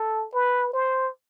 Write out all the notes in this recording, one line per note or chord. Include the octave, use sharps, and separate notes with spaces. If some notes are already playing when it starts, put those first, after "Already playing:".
Already playing: A4
B4
C5